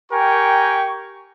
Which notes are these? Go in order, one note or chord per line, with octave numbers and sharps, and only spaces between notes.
G4 A#4 G5 G#5 C#6